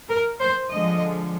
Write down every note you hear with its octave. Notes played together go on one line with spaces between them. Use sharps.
A#4
C5
D3 F3 G#3 D#5